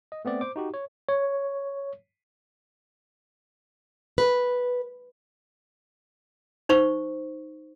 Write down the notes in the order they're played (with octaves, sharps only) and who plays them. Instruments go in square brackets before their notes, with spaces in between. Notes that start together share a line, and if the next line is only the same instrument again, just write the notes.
[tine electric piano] D#5
A3 B3 C4 D5
C5 D6
D#4 F#4 G4
C#5
C#5
[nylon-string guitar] B4
[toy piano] D#4 C5 C#6